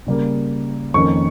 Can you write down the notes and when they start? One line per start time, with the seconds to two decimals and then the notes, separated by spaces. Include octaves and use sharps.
0.07 C#3 G3 A#3
0.94 F2 D#3 A#3 C#4 C#6